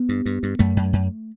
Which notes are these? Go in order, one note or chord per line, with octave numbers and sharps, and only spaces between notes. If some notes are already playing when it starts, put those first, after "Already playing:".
Already playing: B3
G2
G2
G2
F#2 A3
F#2
F#2